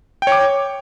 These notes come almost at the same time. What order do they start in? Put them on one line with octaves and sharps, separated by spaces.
G5 C#5 D6